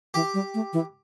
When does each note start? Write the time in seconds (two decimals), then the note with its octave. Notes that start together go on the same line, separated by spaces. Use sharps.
0.14 E3 G4
0.34 G3
0.54 A3
0.73 E3